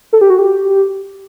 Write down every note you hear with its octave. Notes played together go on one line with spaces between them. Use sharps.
A4
G4
F#4
G4